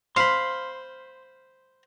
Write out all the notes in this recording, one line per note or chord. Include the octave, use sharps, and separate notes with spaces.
C5 F5 B5 C6